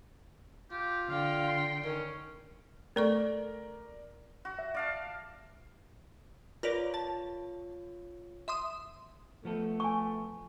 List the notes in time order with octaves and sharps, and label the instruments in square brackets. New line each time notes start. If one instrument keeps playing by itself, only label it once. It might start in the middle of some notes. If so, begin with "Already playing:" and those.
[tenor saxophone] F4 [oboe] G4
[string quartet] D3 G5 [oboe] F5
[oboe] C6
[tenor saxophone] D#3 [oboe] C#4
[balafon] A3 A4 C#6 [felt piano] A#4 D5
[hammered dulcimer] F#4
[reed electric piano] E5
[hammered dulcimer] D5 F5 A5
[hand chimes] F4 C#5 [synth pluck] A#4 B4 D5
[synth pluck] A5
E5 C6 D#6
[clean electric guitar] F3 B3 A4 [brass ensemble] A3
[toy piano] G#5 C#6